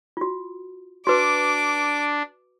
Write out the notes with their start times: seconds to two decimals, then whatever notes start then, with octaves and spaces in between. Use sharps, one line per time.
0.17 F4 F#4
1.07 D4 F#4 B4 D6